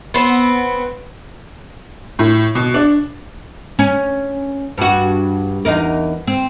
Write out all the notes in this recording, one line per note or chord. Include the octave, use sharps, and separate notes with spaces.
B3 C4
A2
B2
D4
C#4
G2 F#4
E2 D#4 A#4
C4